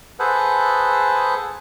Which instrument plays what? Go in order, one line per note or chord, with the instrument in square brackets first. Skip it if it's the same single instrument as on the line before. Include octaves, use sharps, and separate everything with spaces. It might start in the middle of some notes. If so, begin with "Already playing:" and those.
[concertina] G#4 A4 B4 C5 F#5